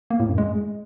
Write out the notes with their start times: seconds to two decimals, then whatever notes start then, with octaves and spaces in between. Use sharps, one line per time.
0.10 A#3
0.20 A2
0.29 F#2
0.38 G#3